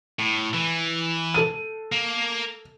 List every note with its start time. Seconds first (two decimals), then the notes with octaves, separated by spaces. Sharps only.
0.19 A2
0.54 E3
1.34 A4 D#7
1.92 A#3